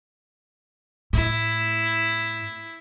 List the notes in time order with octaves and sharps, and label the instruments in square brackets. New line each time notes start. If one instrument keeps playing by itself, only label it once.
[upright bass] A2 [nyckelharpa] E4